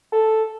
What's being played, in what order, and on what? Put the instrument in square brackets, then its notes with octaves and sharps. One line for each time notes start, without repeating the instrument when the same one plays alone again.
[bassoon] A4